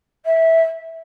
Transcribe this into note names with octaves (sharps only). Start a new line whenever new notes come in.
E5